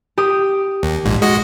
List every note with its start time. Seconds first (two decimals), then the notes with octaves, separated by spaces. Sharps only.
0.18 G4 D#6
0.83 D#2
1.05 A#1 G#2
1.22 G#3 F#4 D#5